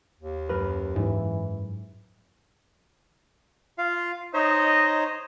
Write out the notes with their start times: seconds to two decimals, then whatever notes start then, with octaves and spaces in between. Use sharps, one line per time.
0.19 D#2
0.49 F#2 A#4 B4
0.96 G#2 E3
3.78 F4 F5
4.34 D#4 C5 C#5 D#5